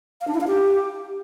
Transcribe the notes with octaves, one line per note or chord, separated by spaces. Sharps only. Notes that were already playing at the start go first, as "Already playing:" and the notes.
F5
D4
E4
F5
G4